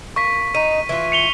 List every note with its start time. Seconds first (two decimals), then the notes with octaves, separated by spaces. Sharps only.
0.16 A#3 C#6 B6
0.55 D#4 D#7
0.89 E3 F4
1.12 C#7 F7 G7